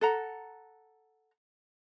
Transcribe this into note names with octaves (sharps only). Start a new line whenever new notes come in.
A4 F#5 A#5